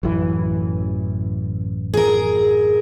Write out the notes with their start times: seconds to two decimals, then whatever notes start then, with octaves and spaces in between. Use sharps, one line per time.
0.03 A1 F#2 E3
1.94 G#4 A#4